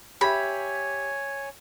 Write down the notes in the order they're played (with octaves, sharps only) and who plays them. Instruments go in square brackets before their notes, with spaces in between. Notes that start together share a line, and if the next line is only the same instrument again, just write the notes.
[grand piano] G4 E5 [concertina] C#5 G#5 [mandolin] B5